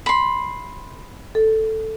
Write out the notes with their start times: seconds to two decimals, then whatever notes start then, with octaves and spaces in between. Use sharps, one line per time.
0.06 B5 C6
1.35 A4